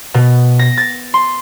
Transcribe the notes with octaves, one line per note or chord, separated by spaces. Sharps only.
B2
A#6
A6
C6